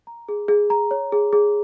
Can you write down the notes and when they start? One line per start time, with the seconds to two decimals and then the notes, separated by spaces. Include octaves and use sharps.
0.07 A#5
0.29 G#4
0.48 G#4
0.70 A#5
0.91 C#5
1.12 G#4
1.33 G#4